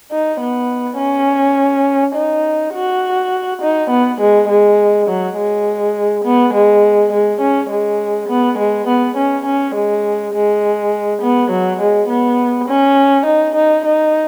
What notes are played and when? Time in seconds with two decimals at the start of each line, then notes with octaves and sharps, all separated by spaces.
0.11 D#4
0.41 B3
0.98 C#4
2.15 D#4
2.74 F#4
3.62 D#4
3.90 B3
4.20 G#3
4.49 G#3
5.07 F#3
5.37 G#3
6.24 B3
6.54 G#3
7.12 G#3
7.41 C#4
7.70 G#3
8.29 B3
8.59 G#3
8.88 B3
9.17 C#4
9.45 C#4
9.75 G#3
10.34 G#3
11.22 B3
11.51 F#3
11.80 G#3
12.09 B3
12.68 C#4
13.26 D#4
13.55 D#4
13.85 D#4